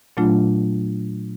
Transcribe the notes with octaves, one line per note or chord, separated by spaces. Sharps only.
A#2 F#3 A3 D4 F4